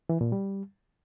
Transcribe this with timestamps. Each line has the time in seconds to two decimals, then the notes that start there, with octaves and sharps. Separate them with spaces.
0.09 E3
0.21 A#2
0.32 G3